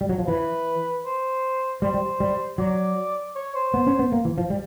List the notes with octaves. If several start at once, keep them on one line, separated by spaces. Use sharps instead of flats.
G3
F#3
F3
E3 B4
C5
G3 C5
G3
G3
F#3 D5
C#5
C5
B3
C#4
B3
A#3
E3
F3
G3